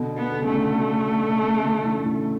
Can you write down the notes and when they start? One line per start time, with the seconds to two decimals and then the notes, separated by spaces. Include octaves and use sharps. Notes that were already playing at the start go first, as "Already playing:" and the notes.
Already playing: B2 D3
0.18 B3
0.32 D3
0.42 C#3 A3
0.52 B2 D3
0.76 B2
1.19 B2
1.43 B2
1.53 C#3
1.62 B2 D3
1.84 C#3 E3
2.05 A2 C#3